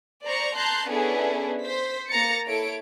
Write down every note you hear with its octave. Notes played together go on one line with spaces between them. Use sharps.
C5 D5 A#5 C#6
A5 A#5 C6 F#6 G6
B3 C#4 D4 E4 G#4 A4
C5 B6
A#3 A#5 A6 C#7
E4 A4 C#5 D7